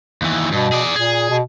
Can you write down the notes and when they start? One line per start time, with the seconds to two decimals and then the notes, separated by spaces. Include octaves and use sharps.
0.22 D#2 E3
0.52 G2 B2
0.72 G#4 D5
0.96 A#2 G#4
1.30 B2